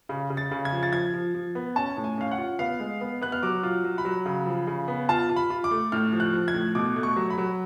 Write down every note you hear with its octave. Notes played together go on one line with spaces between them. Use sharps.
C#3
C#3
A6
C#3
G#6
F3
A6
F3 G#6
F3
F3
B3
C#4 A5
A2
G#5
C#4 F5
F#5
F4
B3 F5
G#3
B3
B3 F#6
F6
F#3 D6
F4
F#3
B5
F#3
C#3
F3
C#3
B3
F4 A5
F4
B5
F4
D6
A3
A2 F6
F3
F#6
F3
G#6
A2
B2 D6
A3
C#6
F#3
B5
F#3